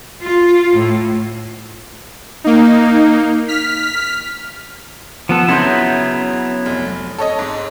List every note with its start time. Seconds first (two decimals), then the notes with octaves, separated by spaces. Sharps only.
0.21 F4
0.76 A2
2.44 A#3 D#4
3.48 F6 B6
5.29 F3 B3 A4
5.48 C#3 F#3 B3 E4 C6 G6
6.66 F1
7.18 A4 C#5 D#5
7.39 G#2